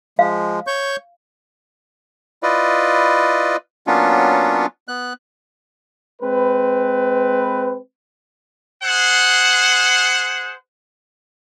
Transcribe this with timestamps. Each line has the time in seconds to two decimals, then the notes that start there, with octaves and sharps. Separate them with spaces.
0.19 F3 G#3 F5
0.67 C#5 C#6 G6
2.43 E4 F4 B4 D5 D#5
3.87 F#3 A#3 B3 C#4 D4 F4
4.88 B3 F#6
6.22 G#3 C4 B4
8.83 G#4 C5 F#5